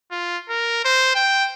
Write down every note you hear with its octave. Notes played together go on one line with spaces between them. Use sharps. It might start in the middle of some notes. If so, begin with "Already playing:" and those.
F4
A#4
C5
G5